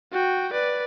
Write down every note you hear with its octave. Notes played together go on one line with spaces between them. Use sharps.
F#4 G5
B4 D5